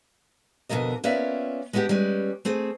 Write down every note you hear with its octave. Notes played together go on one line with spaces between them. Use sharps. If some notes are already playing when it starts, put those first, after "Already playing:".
F2 B2 D3 A3 A#4 D#5
A#3 B3 C#4 F4 D5 E5
G#3 B3 D4 F4 G4
G3 G#3 C#4 B4
A3 C4 G#4